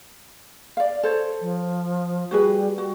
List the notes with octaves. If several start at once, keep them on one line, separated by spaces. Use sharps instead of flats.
D5 F5
A4 C5 C#5
F3
G3 F#4 G#4 B4
G3 F#4